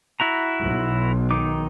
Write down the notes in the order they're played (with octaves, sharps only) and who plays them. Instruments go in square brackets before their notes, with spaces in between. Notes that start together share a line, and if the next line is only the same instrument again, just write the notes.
[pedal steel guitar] E4 F#4 A#5
[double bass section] B1
[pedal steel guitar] D#3 D#4 D6